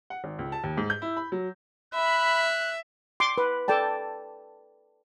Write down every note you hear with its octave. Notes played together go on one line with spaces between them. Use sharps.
F#5
G#1
C#2
A5
D#2
G#2
G6
E4
B5
F#3
E5 B5 F#6
C6 D6
B4
A4 D5 G5 A5